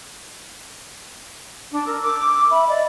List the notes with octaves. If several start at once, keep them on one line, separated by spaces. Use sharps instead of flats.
D4
A#4 E6
D6
E5 B5
D5 D#5